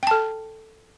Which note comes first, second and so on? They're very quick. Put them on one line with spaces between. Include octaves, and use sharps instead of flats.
G5 A5 A4